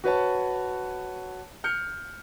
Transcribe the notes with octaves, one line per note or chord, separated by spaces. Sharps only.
F#4 B4 C#5 A5
F6 G6 C#7